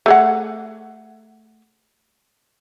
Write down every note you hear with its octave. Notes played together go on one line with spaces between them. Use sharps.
A3 G#4 F#5